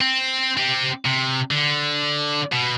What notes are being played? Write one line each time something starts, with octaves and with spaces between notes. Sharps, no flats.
C4
C4 G4
C3
D3
B2